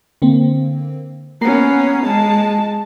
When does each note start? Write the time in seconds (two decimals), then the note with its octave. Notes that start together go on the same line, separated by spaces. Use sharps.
0.22 D3 A#3 C4
1.41 A#3 B3 C#4 A#5 C7
2.05 G#3 A5